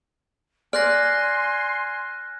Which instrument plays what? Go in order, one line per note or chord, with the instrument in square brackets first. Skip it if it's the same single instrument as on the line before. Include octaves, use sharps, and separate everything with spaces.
[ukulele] D5 [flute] G#5 [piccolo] C6 [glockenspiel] F6 F#6 A#6